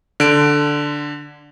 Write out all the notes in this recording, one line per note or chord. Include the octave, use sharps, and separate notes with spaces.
D3 D7